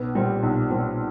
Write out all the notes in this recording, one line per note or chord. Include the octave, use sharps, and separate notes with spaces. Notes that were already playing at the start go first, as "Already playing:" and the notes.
Already playing: B1 B4
A#2 G3 C4
B1
A#2 G3 C4